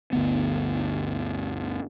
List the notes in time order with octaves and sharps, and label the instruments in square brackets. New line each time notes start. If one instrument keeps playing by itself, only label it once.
[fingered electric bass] G1 D2 B3